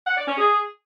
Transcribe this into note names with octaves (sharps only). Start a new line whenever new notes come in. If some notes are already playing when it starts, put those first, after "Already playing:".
F#5
D5
C#4
G#4